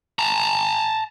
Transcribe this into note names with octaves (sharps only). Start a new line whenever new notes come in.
A5 A#5